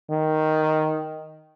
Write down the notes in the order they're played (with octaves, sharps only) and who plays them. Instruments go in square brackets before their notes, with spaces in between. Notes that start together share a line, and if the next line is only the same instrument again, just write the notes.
[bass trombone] D#3